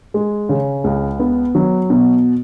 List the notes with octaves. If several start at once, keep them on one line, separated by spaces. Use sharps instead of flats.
G#3
C#3
C#2
B3
F#3
B2